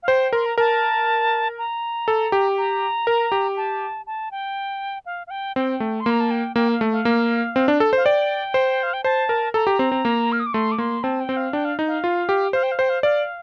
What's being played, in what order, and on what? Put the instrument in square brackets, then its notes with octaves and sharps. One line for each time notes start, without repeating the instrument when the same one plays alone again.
[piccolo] F5
[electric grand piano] C5 [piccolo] G5
[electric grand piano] A#4 [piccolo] C6
[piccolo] A#5
[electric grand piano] A#4 [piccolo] A5
[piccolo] A#5
[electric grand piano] A4
G4
[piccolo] A#5
[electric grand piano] A#4
G4
[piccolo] A5
A5
G5
F5
F5
G5
[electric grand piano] C4 [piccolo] G5
[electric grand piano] A3
[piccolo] C6
[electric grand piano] A#3 [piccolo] A#5
[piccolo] A5
G5
[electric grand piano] A#3 [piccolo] G5
[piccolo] F5
[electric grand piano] A3
[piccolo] F5
[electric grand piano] A#3
C4
D4
A4
C5
[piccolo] F5
[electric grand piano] D5 [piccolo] G5
[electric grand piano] C5
[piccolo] F5
G5
[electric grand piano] C5 [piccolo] A5
[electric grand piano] A#4
[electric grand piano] A4 [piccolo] A#5
[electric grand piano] G4
C4
C4
A#3
[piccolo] F6
D#6
D6
[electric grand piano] A3 [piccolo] C6
[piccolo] D6
[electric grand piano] A#3 [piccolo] C6
[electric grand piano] C4 [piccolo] A5
[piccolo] G5
[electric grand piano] C4
[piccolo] F5
[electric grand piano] D4 [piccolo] G5
[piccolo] F5
[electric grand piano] D#4
[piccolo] F5
[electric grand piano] F4
G4
[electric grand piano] C5 [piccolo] F5
[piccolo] G5
F5
[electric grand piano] C5 [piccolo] G5
[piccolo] F5
[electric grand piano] D5 [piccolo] F5